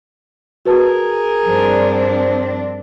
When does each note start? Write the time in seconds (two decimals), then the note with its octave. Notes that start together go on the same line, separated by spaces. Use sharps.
0.66 F#4 G#4 A#4 B4 A5
1.45 G2 F3 C4 D4